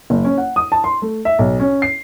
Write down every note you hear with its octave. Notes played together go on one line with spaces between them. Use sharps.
F#1
C#4
F#5
D#6
A5
C6
A3
E5
B1
C#4
C7